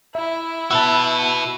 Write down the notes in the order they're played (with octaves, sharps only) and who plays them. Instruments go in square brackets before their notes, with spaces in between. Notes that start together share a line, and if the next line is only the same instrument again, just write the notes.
[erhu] E4 [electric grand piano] E5
[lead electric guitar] F#4 B4 [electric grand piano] A5 E6